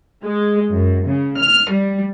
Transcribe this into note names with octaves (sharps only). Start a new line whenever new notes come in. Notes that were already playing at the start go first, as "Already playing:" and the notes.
G#3
F#2
C#3
F6
G3